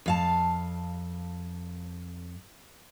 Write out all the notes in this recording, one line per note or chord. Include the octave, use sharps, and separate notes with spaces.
F2 F5 A5